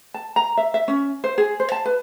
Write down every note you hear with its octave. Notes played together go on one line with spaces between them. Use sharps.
A5
A#5
E5
E5
C#4
C5
G#4
C5
A5
B4